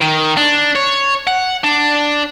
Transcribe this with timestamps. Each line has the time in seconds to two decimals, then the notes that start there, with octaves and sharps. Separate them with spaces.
0.01 D#3
0.37 D4
0.76 C#5
1.27 F#5
1.64 D4